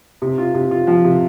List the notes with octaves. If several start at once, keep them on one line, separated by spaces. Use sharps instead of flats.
C3
F4
C3
F4
F3
C3